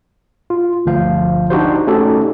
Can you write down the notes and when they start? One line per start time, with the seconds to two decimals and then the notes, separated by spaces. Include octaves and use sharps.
0.50 F4
0.86 G1 D2 F3 C5 F5
1.50 D4 D#4 F#4 G4 C5
1.87 A3 C#4 D#4 F#4 G4 A4